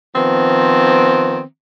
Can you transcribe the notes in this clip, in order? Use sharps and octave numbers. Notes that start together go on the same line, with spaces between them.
D#3 F3 B3 C4